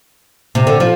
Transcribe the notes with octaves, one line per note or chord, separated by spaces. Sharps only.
C3
D3
F3